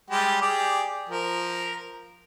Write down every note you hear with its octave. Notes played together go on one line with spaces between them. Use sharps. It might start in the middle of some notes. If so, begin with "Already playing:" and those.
G3 G#3 G4
G4 G#4 D5
F3 A#4